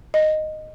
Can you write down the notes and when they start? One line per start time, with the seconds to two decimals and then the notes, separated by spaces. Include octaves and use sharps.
0.14 D#5